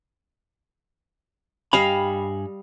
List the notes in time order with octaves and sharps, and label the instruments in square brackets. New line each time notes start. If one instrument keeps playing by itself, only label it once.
[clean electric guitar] G2 G#5 B5 [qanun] G3 D#5 F5